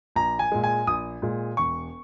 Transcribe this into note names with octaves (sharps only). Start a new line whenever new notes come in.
A#1 A#5
G#5
A#2 G#3
G#5
A#1 D#6
A#2 G#3
E1 C#6